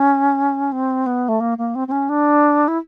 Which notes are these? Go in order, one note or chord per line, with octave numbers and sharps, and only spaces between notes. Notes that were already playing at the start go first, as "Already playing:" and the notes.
Already playing: C#4
C4
B3
A3
A#3
A#3
C4
C4
C#4
D4
E4